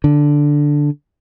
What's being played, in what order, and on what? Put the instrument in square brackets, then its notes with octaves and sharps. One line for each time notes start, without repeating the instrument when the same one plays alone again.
[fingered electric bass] D3